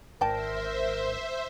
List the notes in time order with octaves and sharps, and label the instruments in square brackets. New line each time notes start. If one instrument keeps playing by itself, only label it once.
[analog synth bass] G#1 [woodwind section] A#4 [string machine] C5 E5 [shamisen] D5 G5 A5